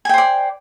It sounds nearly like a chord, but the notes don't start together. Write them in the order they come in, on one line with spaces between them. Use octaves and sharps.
G#5 G5 C5 D5